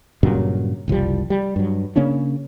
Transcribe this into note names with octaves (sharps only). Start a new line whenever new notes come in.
G2 A#2 C#3 F#3
F#1 C2 F3 G3
G3
G2 F#3
C#3 A#3 C#4 D4